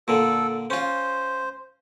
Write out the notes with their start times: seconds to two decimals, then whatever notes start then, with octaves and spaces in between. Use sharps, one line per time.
0.08 A#2 D3 A4
0.70 C#4 F4 C5